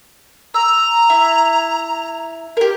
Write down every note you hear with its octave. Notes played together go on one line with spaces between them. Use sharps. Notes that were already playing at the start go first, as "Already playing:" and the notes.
A#5 E6
E4
G4 A#4